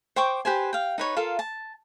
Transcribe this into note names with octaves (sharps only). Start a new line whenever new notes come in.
C5 G5 C#6 D6
G4 B4 C5 G#5
F5 G5
D#4 B4 C#5
F4 A4 A#4 F5
A5